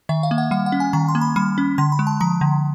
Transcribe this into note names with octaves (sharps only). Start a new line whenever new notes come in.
D#3 E5
F5
A#3
F#5
G3 F#5
F#5
C#4
G#5
D#3 A#5
C6
A#3
B5
G3 B5
C#4
D3 C6
B5
G#3
A5
F3 A#5
D3